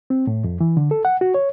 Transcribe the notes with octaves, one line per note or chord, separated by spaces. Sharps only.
C4
A2
F2
E3
D3
A4
F#5
F#4
C#5